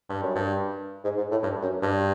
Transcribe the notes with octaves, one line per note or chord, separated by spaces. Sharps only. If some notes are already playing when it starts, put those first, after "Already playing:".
G2
F#2
G2
G#2
G#2
A2
G2
F#2
G2